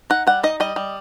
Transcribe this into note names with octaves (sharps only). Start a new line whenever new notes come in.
D#4 F#5
G3 F#5
D#4 D#5
G3 D#5
G3